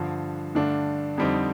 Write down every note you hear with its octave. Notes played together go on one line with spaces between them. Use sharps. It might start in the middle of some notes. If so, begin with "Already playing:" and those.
Already playing: G2 D3 F3
G2 D3 A3 D4
F2 D3 G3 C4 D#4